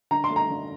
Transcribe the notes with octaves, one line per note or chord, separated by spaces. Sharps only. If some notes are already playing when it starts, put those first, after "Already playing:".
D3 A#5
C6
A3
A#5
D3